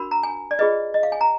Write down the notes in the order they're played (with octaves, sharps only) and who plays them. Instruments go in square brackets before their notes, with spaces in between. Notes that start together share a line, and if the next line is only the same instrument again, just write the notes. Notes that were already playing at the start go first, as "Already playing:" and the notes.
Already playing: [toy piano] D4 F#4 A#4 B5
A#5
G#5
D5
F4 G#4 B4 D#5
D#5
F5
G#5
A#5